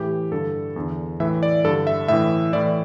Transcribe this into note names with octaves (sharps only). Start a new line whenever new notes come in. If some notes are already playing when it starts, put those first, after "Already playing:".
Already playing: A2 E3 G4
G2 D3 A4
E2 D3
A2 E3 E5
D5
G2 D3 A4
E5
A2 E3 E5
A2 E3 D5